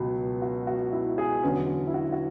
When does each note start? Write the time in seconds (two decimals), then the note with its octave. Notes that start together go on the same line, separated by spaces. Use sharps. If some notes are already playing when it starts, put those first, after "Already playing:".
Already playing: C#2 B2 F#3
0.42 F#4
0.67 F#4
0.92 E4
1.18 G#4
1.43 E2 D3 F#3 C#4
1.87 E4
1.94 F#4
2.12 F#4